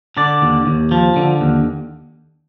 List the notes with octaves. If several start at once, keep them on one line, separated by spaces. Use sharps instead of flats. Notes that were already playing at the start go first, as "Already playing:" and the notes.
D3 D5
D#2
D#2
F3
D3
D#2